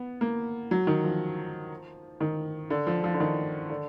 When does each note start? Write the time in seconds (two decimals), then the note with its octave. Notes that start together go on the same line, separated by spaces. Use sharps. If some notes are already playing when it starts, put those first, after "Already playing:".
Already playing: B3
0.21 A#3
0.71 F#3
0.87 D#3
1.04 F3
2.20 D#3
2.70 D3
2.87 F3
3.04 F3
3.14 D3
3.20 D#3
3.70 D3